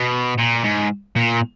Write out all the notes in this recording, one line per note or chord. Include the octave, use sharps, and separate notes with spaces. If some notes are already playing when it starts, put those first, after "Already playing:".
Already playing: B2
A#2
G#2
A#2